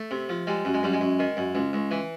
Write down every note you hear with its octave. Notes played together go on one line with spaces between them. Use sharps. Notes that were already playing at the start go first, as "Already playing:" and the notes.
Already playing: A3
C3
F3
G3 G#3
F#2
G#3
F#2 G3
G#3
F#2
D#3
F#2
C#2
C#2
E3